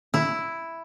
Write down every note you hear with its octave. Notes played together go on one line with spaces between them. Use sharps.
E4